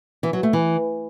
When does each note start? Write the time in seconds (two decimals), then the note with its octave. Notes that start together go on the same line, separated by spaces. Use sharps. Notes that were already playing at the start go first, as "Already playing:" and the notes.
0.23 E3
0.33 F#3
0.43 A3
0.53 E3